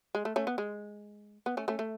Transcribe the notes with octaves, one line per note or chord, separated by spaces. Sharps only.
G#3
A3
A3 C#4
B3
G#3
B3
A3 C#4
A3 C#4
A3